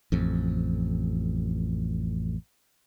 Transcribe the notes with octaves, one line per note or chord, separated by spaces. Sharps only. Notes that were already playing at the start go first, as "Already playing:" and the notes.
A1 F2